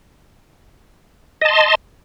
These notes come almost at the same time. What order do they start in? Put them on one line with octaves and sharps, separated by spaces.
D#5 A5 C6